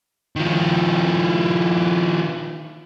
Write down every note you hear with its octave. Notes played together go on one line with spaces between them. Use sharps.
D#3 F3